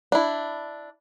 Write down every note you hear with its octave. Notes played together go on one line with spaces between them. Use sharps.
D4 E4